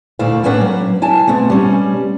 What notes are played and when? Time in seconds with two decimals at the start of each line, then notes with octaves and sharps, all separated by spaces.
0.19 D2 A#2 A3 E4 F5
0.43 A2 A#3 C#4 D4 B4 F#5
0.61 F#3
1.02 E4 G#5 A5
1.27 B2 A3 B3 C4
1.50 G3 C#4